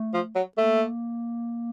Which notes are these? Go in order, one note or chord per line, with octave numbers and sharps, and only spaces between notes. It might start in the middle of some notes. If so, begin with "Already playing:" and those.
Already playing: A3
F3
F#3
A3 A#3